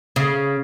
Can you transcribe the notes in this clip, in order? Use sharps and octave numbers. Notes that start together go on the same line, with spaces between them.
C#3